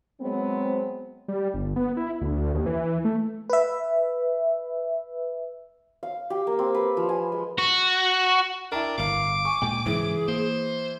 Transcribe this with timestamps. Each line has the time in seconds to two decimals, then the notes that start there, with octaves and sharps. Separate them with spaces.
0.20 F#3 G#3 B3 C4
1.28 G3
1.54 G1
1.76 B3
1.97 E4
2.21 D2
2.54 D#2
2.66 E3
3.05 A3
3.50 B4 E5
6.03 F5
6.30 G4
6.47 A#3
6.59 C4
6.75 B4
6.97 F3
7.09 G#5
7.32 G#3
7.58 F#4
8.72 D4 E4 A#4 G5
8.98 G1 A2 F5 D6
9.45 G#5 C#6
9.62 D2 A#2 G#3 G5
9.86 G#2 C#3 E3 F#3 G#4
10.28 A#3 C5